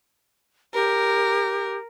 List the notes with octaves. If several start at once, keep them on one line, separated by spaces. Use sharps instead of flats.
G4 A#4